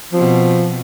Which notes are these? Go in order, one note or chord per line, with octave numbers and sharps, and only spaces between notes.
B2 F3 C4